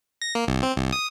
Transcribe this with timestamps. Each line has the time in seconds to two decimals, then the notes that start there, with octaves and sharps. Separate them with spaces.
0.22 A#6
0.35 A#3
0.48 C2
0.63 C4
0.76 C2
0.92 D#6